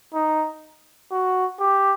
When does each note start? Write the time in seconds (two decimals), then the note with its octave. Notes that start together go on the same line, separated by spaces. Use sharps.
0.14 D#4
1.11 F#4
1.60 G4